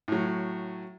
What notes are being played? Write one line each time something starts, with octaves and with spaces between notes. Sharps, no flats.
A2 F#3